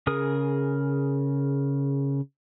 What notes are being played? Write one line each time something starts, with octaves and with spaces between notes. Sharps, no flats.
C#3 G#4 A#4 D#6